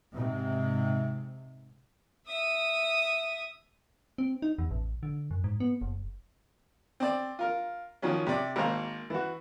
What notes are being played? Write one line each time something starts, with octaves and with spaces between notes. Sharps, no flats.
G#2 C3
E5 D#6
C4
D#4
E2
A1
D3
F#2
G#2
B3
F#1
C4 D5
F4 A#4
D#3 F3 F#3 C#4
C3 D5
G#1 A#3 C5 A#5
E3 F#4